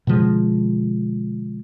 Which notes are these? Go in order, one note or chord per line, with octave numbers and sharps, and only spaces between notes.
B2 D3 F3 G#3